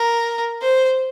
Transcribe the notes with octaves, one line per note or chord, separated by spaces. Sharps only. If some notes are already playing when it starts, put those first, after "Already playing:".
Already playing: A#4
C5